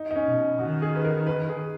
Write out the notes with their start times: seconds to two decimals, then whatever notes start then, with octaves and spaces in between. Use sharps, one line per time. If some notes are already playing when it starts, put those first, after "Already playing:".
Already playing: D#4
0.11 D#4
0.16 C#4
0.26 B2
0.59 D#3 F#4
0.82 G#4
0.95 B4
1.05 A#4
1.27 B4
1.49 G#4